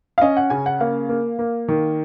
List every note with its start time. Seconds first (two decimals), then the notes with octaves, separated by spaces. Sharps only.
0.18 F5
0.21 C#4 D#5
0.37 F#5
0.50 C#3 G#5
0.66 F#5
0.80 A#3 F5
1.09 A#3
1.39 A#3
1.68 D#3